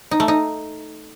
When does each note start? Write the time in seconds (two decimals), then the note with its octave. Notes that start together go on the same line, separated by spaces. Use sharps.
0.11 D#4
0.20 A3
0.28 D#4